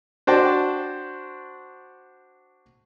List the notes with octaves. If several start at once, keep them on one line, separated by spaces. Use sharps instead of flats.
D4 F#4 C5 G5 A5